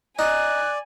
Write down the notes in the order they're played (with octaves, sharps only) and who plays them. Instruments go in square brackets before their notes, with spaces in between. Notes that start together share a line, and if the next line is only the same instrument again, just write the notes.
[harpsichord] D#4 [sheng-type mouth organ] D5 [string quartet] G#5 [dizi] F#6